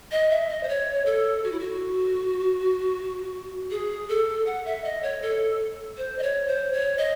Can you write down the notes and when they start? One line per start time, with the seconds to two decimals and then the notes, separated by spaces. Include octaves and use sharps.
0.11 D#5
0.30 E5
0.50 D#5
0.63 C5
0.69 C#5
1.06 A4
1.44 F#4
1.52 E4
1.60 F#4
3.71 G#4
4.09 A4
4.46 F#5
4.65 E5
4.84 D#5
5.03 C#5
5.22 A4
5.97 C5
6.18 D#5
6.23 C#5
6.48 C5
6.73 C#5
6.98 D#5